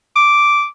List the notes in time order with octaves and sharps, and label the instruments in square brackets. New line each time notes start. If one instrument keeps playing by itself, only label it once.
[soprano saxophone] D6